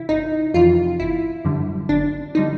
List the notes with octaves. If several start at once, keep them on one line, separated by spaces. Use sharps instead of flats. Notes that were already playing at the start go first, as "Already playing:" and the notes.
Already playing: C3 E3 E4
G1 D#4
F2 C3 E3 F4
G1 E4
F#2 D3 G3
G1 D4
D3 G3 D#4